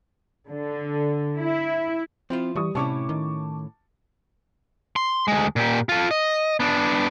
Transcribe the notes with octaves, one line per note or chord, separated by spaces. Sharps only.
D3
E4
F3 C4 E4 F4
E3 G3 C#6 D#6
A2 C3 C#4 E4 A5 C#6 D6
D#3
C6
D2 G#3
A#2 G4
F4 A4
D#5
B3 D4